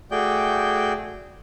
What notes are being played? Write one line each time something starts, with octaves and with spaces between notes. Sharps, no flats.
A3 F#4 G#4 D5 G5 G6